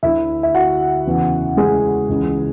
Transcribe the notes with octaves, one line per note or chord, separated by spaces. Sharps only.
D2 D3 E4 E5
E5
F#4 F#5
E2 C#3 E3
G#3 G#4
C#2 C#3 E3